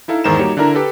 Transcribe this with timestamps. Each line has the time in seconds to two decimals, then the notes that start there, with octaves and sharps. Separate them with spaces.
0.08 D#4 E4 A4 F5
0.24 E2 G#2 D#3 C5 A#5 E7
0.39 G3 A#3 D#4 F#4 G4 C#5
0.57 D3 D4 E4 A#4 A#5
0.75 G4 A4 B4